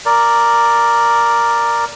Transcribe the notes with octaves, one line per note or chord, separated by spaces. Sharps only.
A#4 D5